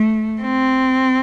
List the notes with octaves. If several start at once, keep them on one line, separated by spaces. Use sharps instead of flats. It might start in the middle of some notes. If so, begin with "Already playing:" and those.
Already playing: A3
C4